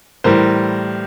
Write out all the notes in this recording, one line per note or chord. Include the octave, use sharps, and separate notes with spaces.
A2 E3 G3 A#4 C5